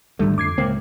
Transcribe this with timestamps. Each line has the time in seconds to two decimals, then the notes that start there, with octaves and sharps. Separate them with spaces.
0.19 G#1 D2 D3 G3 A3
0.38 F2 D6 G#6 C7
0.58 C#2 A2 A#3 C4 C#4